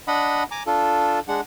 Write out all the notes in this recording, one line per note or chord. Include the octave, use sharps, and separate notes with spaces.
D4 D#5 F#5 B5
G#5 A#5 D6
D4 F4 A4
G#3 D4 F#5